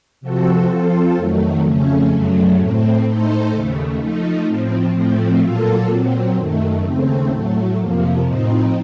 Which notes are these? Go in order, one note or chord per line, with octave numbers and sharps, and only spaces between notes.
C3 F3 C4 F#4 A4
F3 C4 F4 A4
F2 D#3 F#3 A3
F2 C#3 A3 C#4
F#2 C#3 F#3 A3
A2 A3 C4
A2 A3 D#4 A4 C5
D#2 C#3 A3
F3 A3 D#4
A2 F3 C4
A2 F3 A3 C4
A#2 F#3 A#3 F4 A4
A#2 F#3 C4
F#2 D#3 A3
D#2 C#3 A3 C4
A2 F#3 A3
F2 C3 F3 A#3
A2 F3 C4 D#4